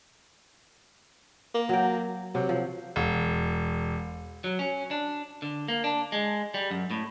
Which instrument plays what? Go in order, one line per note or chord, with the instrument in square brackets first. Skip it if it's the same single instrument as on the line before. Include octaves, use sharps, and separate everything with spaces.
[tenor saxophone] A#3
[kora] F#3 G5
[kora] C3 [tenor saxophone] F#3
[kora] F3
[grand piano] E1
[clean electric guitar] F#3
C#4
D4
D3
A#3
D4
G#3
G3
F#2
A2